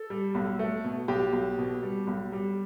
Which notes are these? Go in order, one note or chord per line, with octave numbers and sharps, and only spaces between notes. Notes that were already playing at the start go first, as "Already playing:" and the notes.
Already playing: A4
G3
B1
A3
B2
B1 G4
B1
B2
G3
B1
G3